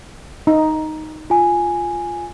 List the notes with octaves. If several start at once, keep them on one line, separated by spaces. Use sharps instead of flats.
D#4
F4 G#5